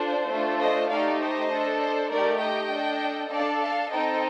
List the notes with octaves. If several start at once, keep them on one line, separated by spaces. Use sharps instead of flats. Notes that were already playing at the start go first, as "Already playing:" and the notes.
Already playing: D4 F4 A4 C5
A3 D4 F4 A4
C5 D#5
A3 D#4 G4 D5 F5
C5 D#5
D4 A4
C5
A3 D#4 G4 A#4 D5
D#5 G5
D4 A4
D4 A4 D5 F5
F5 A5
C4 D#4 A4 D#5 G5